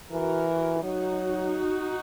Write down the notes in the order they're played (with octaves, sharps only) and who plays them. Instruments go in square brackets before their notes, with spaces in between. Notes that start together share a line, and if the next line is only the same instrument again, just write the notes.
[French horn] E3 [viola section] F#4 A#4
[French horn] F#3 [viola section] D#4 F#4